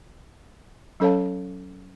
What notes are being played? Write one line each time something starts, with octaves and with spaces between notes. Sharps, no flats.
F#3 C#4 A4 C#5 F5 A5